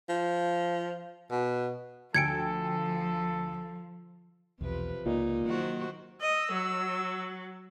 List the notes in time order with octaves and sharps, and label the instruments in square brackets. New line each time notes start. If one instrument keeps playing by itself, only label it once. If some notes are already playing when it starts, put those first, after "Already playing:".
[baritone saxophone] F3
B2
[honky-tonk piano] D2 G5 G#5 [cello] F3 [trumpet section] A4 [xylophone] G#6 C#7 D7
[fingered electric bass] B1 E2 [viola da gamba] C3 F3 B4
[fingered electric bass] C#2 [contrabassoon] A#2 [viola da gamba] D#4
[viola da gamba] D#3 F#4 C5 [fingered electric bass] F#3 A#3
[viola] D#5 [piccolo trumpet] E6
[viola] F#3